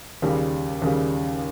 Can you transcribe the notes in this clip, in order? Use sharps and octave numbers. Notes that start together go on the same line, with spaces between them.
D#2 C#3 G3
D#2 C#3 G3